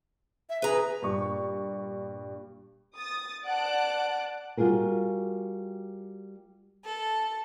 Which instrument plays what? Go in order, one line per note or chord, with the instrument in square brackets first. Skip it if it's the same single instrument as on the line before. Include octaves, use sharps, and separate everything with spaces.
[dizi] E5
[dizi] G#4 [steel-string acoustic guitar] B4 A#5
[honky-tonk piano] G2 A#2 C#6
[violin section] D#6 A6
D5 F#5 A5 F#6 D7
[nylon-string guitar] G3 F4 F#4 G#4 A#4
[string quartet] A4